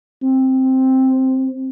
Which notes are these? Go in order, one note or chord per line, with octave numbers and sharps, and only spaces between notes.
C4